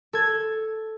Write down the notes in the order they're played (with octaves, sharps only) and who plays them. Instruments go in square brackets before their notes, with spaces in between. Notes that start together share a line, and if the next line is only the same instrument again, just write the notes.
[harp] A4 G#6